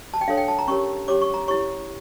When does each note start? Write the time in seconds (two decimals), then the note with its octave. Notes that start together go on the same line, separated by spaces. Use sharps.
0.14 A5
0.21 G5
0.28 D4 A4 C#5 F5
0.37 G5
0.48 A5
0.59 A#5
0.68 C#4 G4 A#4 C#5 C#6
1.08 C#4 G4 C#5 D6
1.22 C#6
1.34 A#5
1.48 E4 G4 C#5 C#6